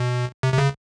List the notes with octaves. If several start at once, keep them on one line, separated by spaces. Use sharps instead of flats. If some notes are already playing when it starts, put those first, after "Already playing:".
Already playing: B2
C3
C3
C#3